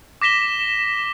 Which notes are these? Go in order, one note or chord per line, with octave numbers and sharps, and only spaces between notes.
D6 A#6 B6 E7 G7